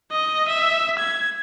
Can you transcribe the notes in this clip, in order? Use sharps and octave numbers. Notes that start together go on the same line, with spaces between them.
D#5
E5
G#6